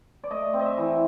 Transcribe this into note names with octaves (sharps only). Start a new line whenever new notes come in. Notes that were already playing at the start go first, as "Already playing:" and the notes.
D5
A3 D#5
C4
D#5
E5
E3